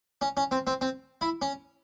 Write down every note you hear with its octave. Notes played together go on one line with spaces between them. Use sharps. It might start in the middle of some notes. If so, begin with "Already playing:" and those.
C#4
C#4
C4
C4
C4
E4
C#4